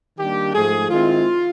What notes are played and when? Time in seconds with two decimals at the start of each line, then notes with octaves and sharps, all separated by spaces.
0.18 D#3 G3 A#3 D4 G4
0.54 G#2 F3 A3 G#4
0.90 D#3 G#3 C4 E4 F4